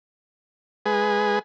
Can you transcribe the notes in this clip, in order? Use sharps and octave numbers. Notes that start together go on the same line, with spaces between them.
G#3 G#4 B4